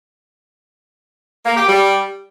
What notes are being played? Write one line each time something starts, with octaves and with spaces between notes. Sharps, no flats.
A#3
G4
G3